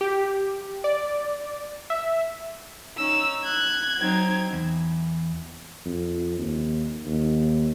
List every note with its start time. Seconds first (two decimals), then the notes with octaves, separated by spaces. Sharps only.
0.01 G4
0.84 D5
1.90 E5
2.97 C#4 D#4 E6
3.44 F#6 G#6
3.97 F#3 C4 D#4
4.53 E2
5.85 F2
6.39 D#2
7.06 D#2